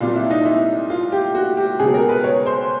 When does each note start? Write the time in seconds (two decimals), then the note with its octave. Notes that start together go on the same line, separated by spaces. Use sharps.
0.01 C2 A#2 F#3 F4
0.16 E4
0.30 D#4
0.45 E4
0.90 F4
1.12 G4
1.35 F#4
1.57 G4
1.79 C#2 B2 F#3 G#4
1.94 A#4
2.09 B4
2.24 C#5
2.46 C5